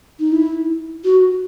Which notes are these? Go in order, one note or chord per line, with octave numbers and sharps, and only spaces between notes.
D#4
E4
F#4